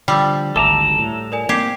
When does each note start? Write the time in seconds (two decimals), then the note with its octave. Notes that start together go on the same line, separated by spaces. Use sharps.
0.08 D3 F3 G3 G5 E6 A6
0.56 G#1 D2 A4 E5 A5 A#5 D6
0.99 A2
1.32 A#4 D5 G#5
1.49 A#3 C4 G4 G#6 C7